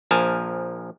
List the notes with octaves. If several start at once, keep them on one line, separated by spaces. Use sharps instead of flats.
A#1 F3 A#4 G#5 A5